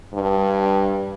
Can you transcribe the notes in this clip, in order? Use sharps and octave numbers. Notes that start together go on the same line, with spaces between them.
G2